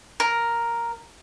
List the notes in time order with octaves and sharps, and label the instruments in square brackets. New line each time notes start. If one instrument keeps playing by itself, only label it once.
[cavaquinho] A#4